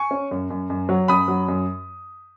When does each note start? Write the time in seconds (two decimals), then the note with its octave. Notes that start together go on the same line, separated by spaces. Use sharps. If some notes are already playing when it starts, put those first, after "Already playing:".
Already playing: G#5 C#6
0.11 C#4
0.31 F#2
0.50 F#2
0.70 F#2
0.89 F#3
1.08 F#2 B5 D#6
1.28 F#3
1.48 F#2